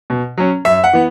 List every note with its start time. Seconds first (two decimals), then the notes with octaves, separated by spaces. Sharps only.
0.10 B2
0.37 F#3 C#4
0.65 F#2 E5
0.84 F#5
0.93 E3 B3